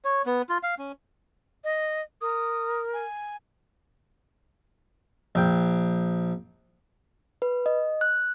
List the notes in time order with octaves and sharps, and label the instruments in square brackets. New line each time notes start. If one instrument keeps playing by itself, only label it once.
[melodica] C#5
B3
F4
F5
C#4
[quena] D#5
[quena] A#4 [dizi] D#6
[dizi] G#5
[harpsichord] A#1 G5
[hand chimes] B4
D#5
F#6